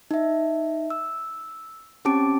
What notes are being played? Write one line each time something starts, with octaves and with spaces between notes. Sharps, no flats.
D#4 E5
E6
C4 C#4 G4 A5 D6 D7